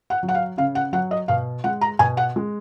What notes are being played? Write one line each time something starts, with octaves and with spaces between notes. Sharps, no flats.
F#5
F#3
F#5
F5
C#3 F5
F#5
F#3 F#5
D#5
B2 F5
G#3 F#5
A#5
B2 G#5
F#5
G#3